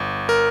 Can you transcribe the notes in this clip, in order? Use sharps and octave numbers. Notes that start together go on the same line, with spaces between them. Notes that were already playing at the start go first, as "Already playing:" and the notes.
Already playing: G1
A#4